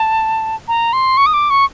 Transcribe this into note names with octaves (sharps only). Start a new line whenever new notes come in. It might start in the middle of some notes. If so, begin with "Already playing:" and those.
Already playing: A5
A#5
C6
C#6
D#6
D6
C#6